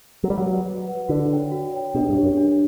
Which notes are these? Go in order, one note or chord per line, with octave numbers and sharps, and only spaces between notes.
F#3 F#4
G3
F#3
B4 F#5
F#4
B4 F#5
D3 F#4
C#5 G5
F#4
C#5 G5
B2 D4
G2
G4 C#5
F#2
D4